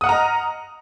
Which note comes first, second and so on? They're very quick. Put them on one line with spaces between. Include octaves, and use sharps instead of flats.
D#6 F#5 F6 A#5 D#5